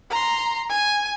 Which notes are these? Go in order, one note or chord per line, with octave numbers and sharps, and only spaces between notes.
A#5 C6
G#5